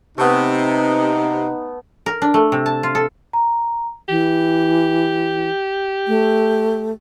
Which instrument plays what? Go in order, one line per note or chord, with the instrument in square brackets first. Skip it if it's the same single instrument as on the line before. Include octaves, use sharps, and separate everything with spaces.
[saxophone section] C3 [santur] A3 B3 [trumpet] D#4
[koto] A#4
D4
A3
C3
A5
F4
A4
[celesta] A#5
[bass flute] E3 [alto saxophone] G4
[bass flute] A3